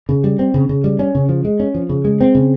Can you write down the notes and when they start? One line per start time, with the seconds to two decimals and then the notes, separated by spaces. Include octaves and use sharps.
0.09 C#3
0.24 G3
0.39 C4
0.54 C#3
0.69 C#3
0.84 G3
0.99 C#4
1.15 C#3
1.29 F3
1.45 G#3
1.60 C#4
1.75 F3
1.89 C#3
2.05 G#3
2.21 C4
2.35 C#3